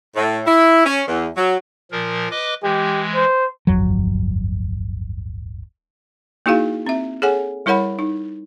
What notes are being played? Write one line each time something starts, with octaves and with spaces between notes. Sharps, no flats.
A2
E4
C#4
E2
F#3
A#2 F3 A#4
B4 D#5 D6
E3 G#3 G4
C5
D1 G1 F2 F#3
A#3 D#4 E4 F#4 G#4 F5
C4 E5
G#4 A4 C#5 F#5 G#5
G3 E4 A#4 C#5 F#5 B5
D#4